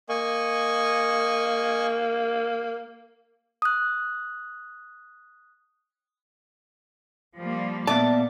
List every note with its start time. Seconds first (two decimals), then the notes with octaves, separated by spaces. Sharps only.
0.09 A#3 D#5 G#5 C#6
3.62 D#6 F#6
7.36 F3 G3 A#3
7.87 A#2 B3 D5 E5 A5